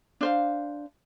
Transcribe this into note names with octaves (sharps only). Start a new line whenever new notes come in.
D4 C5 F5